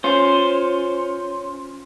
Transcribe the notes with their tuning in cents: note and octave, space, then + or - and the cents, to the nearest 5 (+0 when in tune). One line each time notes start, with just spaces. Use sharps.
C#4 +0 F4 +15 C5 +0